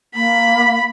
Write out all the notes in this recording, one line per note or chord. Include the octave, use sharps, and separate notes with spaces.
A#3 B5